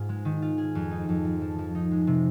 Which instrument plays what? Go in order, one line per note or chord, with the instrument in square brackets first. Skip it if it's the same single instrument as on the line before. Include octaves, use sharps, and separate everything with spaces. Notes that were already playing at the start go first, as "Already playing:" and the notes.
Already playing: [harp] G#2 F4 G#4
G#3
D#3
F4
G#4
F2
D#4
F2
F3
F3
F3
D#4
G#3
C3